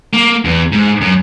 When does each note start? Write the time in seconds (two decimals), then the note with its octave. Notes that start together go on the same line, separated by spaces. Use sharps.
0.13 A#3
0.45 E2
0.72 G#2
1.01 F#2